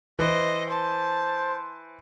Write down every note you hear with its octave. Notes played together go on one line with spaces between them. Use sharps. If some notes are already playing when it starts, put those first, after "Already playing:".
E3 C5 D#5
C5 A5